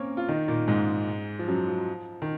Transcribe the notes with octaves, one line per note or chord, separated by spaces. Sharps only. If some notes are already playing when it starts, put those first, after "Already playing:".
Already playing: A#3 C4 C#4 A#4 C#5
F4
D#3 D#4
A#2 A#3
G#2 G#3
F3
F#2 F#3
F3
D#3